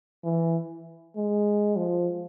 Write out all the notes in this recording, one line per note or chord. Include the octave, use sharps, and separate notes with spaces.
E3
G#3
F3